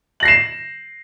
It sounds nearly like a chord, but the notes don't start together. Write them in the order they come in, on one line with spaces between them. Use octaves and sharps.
F#7 A#6 C7 E7